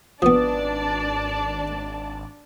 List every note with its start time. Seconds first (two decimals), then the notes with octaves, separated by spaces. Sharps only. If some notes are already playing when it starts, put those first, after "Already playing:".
0.22 G#1 F3 B3 D4 B4 D5 A5 D#6